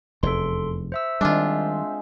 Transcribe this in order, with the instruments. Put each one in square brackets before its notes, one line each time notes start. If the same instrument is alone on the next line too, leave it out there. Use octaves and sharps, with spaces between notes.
[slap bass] F1 E2 [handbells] A4 C6
[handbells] C5 E5 E6
[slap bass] D#3 G3 [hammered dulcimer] G#3 C4 C6 [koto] D4 F4